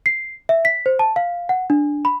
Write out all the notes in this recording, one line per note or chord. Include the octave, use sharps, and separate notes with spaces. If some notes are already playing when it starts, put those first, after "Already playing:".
C7
E5
B6
C5
A5
F5
F#5
D4
B5